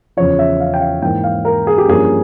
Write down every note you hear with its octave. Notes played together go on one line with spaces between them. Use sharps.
E2 C#3 F3 C#5
E5
F5
G5
F5
G#2 E3 A#3 G5
F5
A#4
G#4
G4
G2 F3 A#3 C#4 G#4